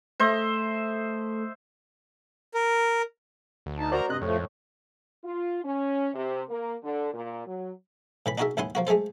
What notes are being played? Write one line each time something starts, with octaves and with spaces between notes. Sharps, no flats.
A3 C5 D#5 E5
A#4
D2
D#4 A5
F#4 A#4 C5 D5 A#5
G2 C3 D#5 F#6
F2 A2 F3 A3
F4
C#4
C3
A#3
D3
A#2
F#3
A2 E3 B5
D4 D#4 F#4 G#4 A#4 E5
A1 D#2 E4 F#5 G#5 C6
F3 A#3 F#4
G#3 A3 G#4 A4 C5